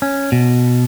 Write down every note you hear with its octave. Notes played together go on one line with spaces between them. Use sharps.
C#4
B2